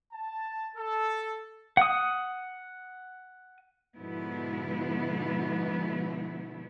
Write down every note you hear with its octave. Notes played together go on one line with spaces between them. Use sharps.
A5
A4
F#5 D#6
G#2 B2 D3 F3 B3 E4